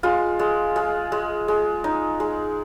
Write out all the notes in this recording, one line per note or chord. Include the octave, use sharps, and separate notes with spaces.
G#3 F4
G#3
G#3
G#3
G#3
D#4
G#3